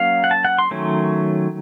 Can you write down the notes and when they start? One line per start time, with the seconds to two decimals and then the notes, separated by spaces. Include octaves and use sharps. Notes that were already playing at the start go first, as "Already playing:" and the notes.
Already playing: F#3 A#3 C#4 F5
0.24 F#5
0.31 A5
0.45 F#5
0.59 C6
0.71 D#3 F#3 A3 C#4